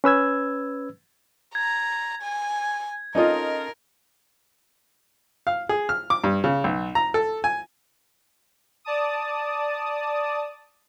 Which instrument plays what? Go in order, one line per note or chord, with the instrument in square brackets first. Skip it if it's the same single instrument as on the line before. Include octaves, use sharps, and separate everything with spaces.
[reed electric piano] C#4 B4 E6 G#6
[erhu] A#5 [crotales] G#6
[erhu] G#5
[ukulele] C#4 A4 D#5 [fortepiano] D#4 F4 [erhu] A#4
[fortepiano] F5
G#4
F6
D6
G2
C#3
B1
A#5
A4
G#5
[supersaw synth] D5 A5 D#6